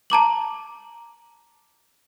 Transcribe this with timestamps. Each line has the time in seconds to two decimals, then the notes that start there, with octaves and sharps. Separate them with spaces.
0.10 A5 A#5 D6 F#7